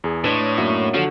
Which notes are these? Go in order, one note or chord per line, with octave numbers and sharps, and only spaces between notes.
E2 G#4
A2 D4 B4 C#5 D#5 C6
F#2 F#3 A#3 E5
D3 F3 F#3